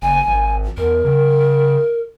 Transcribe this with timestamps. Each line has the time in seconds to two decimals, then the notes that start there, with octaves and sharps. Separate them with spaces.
0.02 F#1 G#5
0.27 G#1
0.78 E2 A#4
1.05 C#3